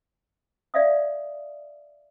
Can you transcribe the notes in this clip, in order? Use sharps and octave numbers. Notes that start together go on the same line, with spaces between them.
D5 E5 F5 D#6